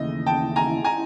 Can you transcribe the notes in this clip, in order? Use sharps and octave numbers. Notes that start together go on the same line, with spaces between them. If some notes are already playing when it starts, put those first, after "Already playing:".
Already playing: D#2 C#3 E3 A3 D#5
G5 A5
G#5 A#5
G#5 A#5